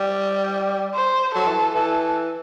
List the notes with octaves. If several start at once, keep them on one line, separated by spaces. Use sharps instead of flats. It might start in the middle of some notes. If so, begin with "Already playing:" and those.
Already playing: G3
C5
F#3 A4
E3
E3
E3 A4